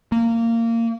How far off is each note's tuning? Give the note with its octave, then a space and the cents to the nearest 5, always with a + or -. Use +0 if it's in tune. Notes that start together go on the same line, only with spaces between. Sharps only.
A#3 -20